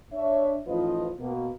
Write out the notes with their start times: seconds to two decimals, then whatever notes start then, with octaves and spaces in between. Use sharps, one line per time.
0.13 D4 C#5 E5
0.67 A1 F3 D#4 F4 B4 D#5
1.20 B2 A#3